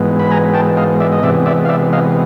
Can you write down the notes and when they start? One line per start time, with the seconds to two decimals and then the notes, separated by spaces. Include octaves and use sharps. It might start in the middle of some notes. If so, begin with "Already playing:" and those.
Already playing: G#2 E3 G#3 B3
0.19 B5
0.31 G#5 A#5
0.54 G5 A5
0.77 D#5 F5
1.00 D5 E5
1.12 D#5
1.23 C3 E3 G#3 B3 D5 E5
1.46 D5 E5
1.65 F5
1.69 D5 E5
1.93 D#5 F5